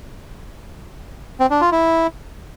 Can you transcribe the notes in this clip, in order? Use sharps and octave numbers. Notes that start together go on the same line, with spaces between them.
C4
D4
F4
E4